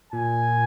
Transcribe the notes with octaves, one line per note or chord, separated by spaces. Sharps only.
A#2 G#5